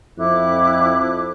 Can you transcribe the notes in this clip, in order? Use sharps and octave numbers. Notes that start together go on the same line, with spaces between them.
F2 E4 D6 F#6